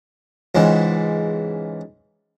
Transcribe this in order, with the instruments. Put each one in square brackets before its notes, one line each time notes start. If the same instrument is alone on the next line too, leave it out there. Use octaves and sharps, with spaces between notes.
[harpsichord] C#2 G#2 E3